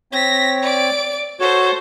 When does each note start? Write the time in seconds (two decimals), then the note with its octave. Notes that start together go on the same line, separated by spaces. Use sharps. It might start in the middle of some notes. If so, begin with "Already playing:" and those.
0.12 C4 C#5 A#6 B6
0.62 D5 D7
1.40 F#4 A4 C5 C#5